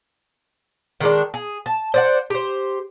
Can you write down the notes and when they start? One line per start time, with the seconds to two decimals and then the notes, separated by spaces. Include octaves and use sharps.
1.01 D#3 G#3 D4
1.34 G#4
1.66 A5
1.94 C5 D5 F#5
2.30 G4 C5